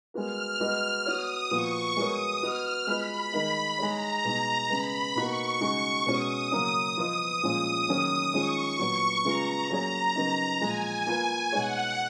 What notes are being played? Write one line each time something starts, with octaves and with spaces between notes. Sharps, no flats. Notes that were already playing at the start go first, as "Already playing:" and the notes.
G#3 B3 F#4 A#4 F6
G#3 B3 F#4 B4 D#5
B3 F#4 C#5 D#6
A#2 F3 B3 F#4 C#6
G#3 B3 F#4 A#4 C#5 D#6
B3 F#4 B4 D#5 F6
G#3 B3 F4 B4 D#5 B5
D#3 G#3 D#4 A#4 D#5
G#3 D#4 G#4 C#5 A#5
B2 G#3 D#4
C#3 G#3 B3 B5
B2 A#3 D#4 F#4 B4 C#6
C#3 G#3 D#4 F#4
B2 G#3 C#4 F#4 D#6
C#3 F#3 A#3 C#4
F3 B3 F4 B4 D#5 D#6
A#2 F3 G#3 C#4
D#3 F#3 A#3 C#4 G#4
D#3 G#3 C#4 F4 G#4 C#6
A#2 F#3 B3 F#4 C#5
C#3 G#3 B3 F4 A#5
F#3 A#3 C#4 G#4 C#5 A#5
C#3 F#3 B3 D#4 A#4
A#2 F3 G#3 G#5
A#3 F4 B4
B2 G#3 D#4 G#4 C#5 F#5